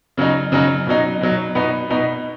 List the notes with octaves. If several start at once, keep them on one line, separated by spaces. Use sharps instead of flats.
C#3 F#3 D#4
C#3 F#3 D#4
B2 F#3 D#4
B2 F#3 D#4
B2 B3 D#4
B2 B3 D#4